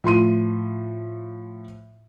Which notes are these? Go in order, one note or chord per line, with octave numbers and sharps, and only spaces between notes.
A2 F3 C6 D#7